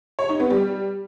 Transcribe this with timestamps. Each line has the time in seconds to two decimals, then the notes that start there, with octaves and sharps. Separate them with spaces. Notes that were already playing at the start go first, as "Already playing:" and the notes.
0.19 C#5
0.29 D#4
0.40 B3
0.50 G3